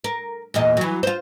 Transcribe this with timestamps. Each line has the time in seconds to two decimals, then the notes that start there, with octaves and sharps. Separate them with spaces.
0.04 A#4
0.54 E2 A#2 D#5
0.77 E3 F#3
1.03 F4 C5